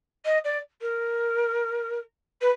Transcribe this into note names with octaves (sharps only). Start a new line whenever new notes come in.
D#5
D5
A#4
B4